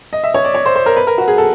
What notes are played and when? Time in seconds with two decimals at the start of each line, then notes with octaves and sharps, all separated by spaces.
0.13 D#5
0.24 E5
0.34 C#5
0.45 D5
0.54 C#5
0.66 C5
0.76 C5
0.86 A#4
0.96 B4
1.07 A#4
1.18 F#4
1.28 G#4
1.38 A4